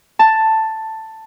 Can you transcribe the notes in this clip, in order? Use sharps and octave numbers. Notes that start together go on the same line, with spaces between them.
A5